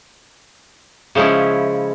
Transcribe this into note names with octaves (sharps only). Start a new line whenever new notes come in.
C#3 F3 G#3 C#4 E4